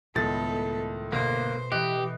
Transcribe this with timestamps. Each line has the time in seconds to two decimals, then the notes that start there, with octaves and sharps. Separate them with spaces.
0.15 C#2 A2 D#3 B3 A4 A6
1.12 G1 B2 A#3 C5
1.72 E3 G4 D#5 F#6